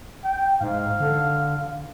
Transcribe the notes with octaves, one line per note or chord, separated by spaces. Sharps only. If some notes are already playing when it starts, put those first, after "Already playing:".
G5
G#2 F5
D3